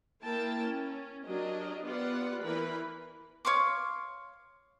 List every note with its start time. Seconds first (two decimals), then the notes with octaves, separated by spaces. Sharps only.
0.23 A#3 E4 A#4 G5 A5
0.62 C#4
1.26 F#3 D4 G4 A#4 D#5
1.83 B3 F4 G4 B4 D5 F#5
2.43 E3 A#4 B4 B5
3.45 C#5 F5 C6 D6